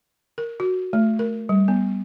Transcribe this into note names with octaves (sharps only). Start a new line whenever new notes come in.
A#4
F#4
A3
A#4
G3
B3